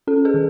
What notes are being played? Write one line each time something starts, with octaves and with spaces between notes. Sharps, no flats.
C#4 A4
G#4 B4
D#3